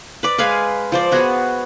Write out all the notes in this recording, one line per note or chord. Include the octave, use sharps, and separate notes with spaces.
B4 D5
G#3 B4 F5 G#5
F3 C5 D5
B3 F#4 G#4